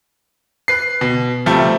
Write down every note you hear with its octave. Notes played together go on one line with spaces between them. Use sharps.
B4 C7
B2
C3 F3 G3 A3